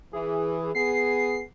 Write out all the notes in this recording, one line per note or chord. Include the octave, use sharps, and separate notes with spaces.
E3 G#4
B3 G#4 C7